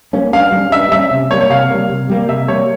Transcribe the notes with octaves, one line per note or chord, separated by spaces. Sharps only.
G3 A#3 C#4
G2 F5
G3 A#3 C#4
G2 E5
G3 A#3 C#4 E5
C3
G3 A#3 C#5
C#5
C3 F5
G3 A#3
C3
G3 A#3
C3 E5
G3 A#3 C#5